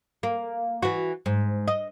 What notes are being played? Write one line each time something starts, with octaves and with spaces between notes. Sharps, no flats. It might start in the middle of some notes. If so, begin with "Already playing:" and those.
A#3
E3 F#4
G#2
D#5